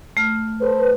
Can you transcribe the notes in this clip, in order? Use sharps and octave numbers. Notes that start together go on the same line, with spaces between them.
A3 F6
A4 B4 C5